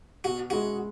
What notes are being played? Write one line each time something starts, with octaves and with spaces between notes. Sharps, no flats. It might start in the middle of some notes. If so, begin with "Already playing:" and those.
B2 F#4
G#3 E4 F#4 G#4